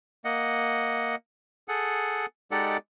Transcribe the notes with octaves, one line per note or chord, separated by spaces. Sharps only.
A#3 D#5 F#5
G#4 A4 F#5
G#3 D#4 G4 A4 D5 F#5